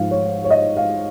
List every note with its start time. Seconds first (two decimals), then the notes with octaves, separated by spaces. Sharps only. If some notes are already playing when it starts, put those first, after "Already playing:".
Already playing: G#2 F3 F5
0.11 C#5
0.44 C#5
0.51 D#5
0.77 F5